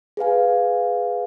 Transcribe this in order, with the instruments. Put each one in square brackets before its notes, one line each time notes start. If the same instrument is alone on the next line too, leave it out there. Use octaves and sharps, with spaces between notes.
[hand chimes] G#4 B4 F5 G#5